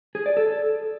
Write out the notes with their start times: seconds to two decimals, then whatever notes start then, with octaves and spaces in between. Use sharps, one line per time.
0.15 G#4
0.26 D5
0.37 A4